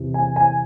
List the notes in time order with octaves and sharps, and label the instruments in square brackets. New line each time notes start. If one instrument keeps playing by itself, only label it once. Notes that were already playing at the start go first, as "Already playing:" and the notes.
Already playing: [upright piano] E2 C3 E3
G#5
G#5